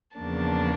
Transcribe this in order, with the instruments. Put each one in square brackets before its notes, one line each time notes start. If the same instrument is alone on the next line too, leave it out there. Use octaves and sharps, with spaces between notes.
[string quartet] E2 C#3 F3 A#3 D4 A5